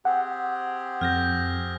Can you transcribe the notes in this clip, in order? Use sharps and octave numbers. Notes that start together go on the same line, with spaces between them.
C4 G4 G#4 F#5
F2 F6 G6 A#6